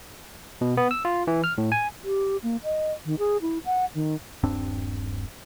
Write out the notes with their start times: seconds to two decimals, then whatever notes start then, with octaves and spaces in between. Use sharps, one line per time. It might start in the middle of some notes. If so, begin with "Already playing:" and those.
0.61 B2
0.77 B3
0.91 E6
1.05 F4
1.27 E3
1.44 F6
1.58 A2
1.72 G#5
2.04 G4
2.43 A#3
2.64 D#5
3.05 D#3
3.19 G#4
3.42 E4
3.65 F#5
3.95 D#3
4.43 D#1 G2 C4 D4